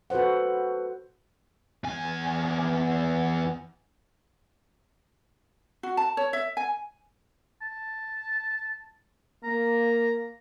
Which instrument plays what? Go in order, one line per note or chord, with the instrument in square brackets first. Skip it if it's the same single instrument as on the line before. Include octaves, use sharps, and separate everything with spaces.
[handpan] F#4 A4 B4 C5 F#5
[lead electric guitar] E2 G#5
[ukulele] F#4
A5
C#5
E5
G#5
[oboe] A5
[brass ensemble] A#3 [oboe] A#5